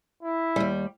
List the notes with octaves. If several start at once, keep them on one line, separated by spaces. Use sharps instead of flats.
E4
D#2 G3